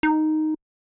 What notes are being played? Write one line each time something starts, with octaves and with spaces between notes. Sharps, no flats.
D#4